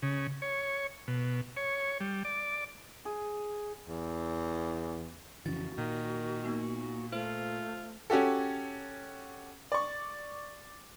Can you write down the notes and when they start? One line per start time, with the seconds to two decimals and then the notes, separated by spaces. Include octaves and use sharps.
0.02 C#3
0.42 C#5
1.08 B2
1.57 C#5
2.00 G3
2.25 D5
3.05 G#4
3.88 E2
5.46 F2 C#3 E3 F#4 A6
5.78 A#2 D#3
6.44 A#3 B3 D#4
7.13 A3 F4 C5
8.10 C#4 F#4 G4 A4
9.72 D5 C#6